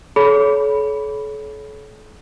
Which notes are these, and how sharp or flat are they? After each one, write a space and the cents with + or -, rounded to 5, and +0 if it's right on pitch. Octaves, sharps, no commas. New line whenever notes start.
A4 -40 C#5 +20 B5 +0